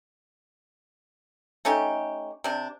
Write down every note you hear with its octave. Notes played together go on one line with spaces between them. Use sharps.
A3 C#4 D#4 G4
C3 D4